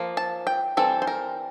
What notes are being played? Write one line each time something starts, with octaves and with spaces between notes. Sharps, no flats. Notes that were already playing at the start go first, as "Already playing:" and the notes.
Already playing: F3 A#3
A5
G5
E3 G3 C4 A4
C5
A#4